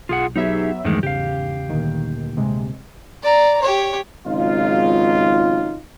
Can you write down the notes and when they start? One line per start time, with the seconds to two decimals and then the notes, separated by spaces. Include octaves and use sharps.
0.09 B1 F4 G#4 F#5
0.36 F#3 B3 D#4 G4 G#4 E5
0.84 E2 G2 D#3 F#3 G#3 A3
1.03 G#1 E2 G#2 C#3 G4 F5
1.69 D2 A#2 D#3
2.36 G2 C3 G#3
3.22 D5 A#5
3.61 G4 C#5
4.26 G#1 C#2 F#3 D#4 F4